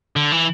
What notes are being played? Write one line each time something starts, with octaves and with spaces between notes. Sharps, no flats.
D3
E3